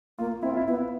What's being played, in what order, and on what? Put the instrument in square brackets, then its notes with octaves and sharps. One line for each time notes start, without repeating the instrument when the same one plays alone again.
[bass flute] A#3 [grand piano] F4
[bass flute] C4 [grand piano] E4
[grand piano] F4
E4
[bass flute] B3 [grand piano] E4